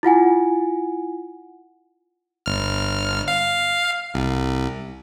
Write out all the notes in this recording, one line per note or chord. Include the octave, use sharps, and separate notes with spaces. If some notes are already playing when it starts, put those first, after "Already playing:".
E4 F4 F#5 G#5
G1 F6
F5
C2